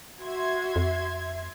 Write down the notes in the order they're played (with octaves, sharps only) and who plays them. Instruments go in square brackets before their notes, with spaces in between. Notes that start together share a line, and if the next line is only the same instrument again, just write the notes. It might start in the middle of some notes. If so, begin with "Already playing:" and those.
[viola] F#4 [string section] E5 C6 G#6
[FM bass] F2